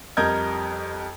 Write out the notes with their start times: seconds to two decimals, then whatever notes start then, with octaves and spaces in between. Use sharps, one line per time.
0.17 F2 G3 A#4 D#5 G6 G#6